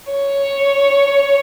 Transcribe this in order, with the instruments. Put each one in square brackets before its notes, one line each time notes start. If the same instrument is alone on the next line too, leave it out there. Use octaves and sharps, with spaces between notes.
[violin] C#5